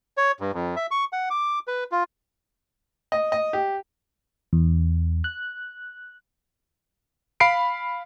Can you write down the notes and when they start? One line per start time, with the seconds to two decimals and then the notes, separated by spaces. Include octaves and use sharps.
0.17 C#5
0.40 G2
0.54 F2
0.76 E5
0.91 C#6
1.13 F#5
1.30 D6
1.67 B4
1.92 F4
3.12 D#5
3.32 D#5
3.53 G4
4.53 E2
5.24 F#6
7.40 F5 B5 C7 D7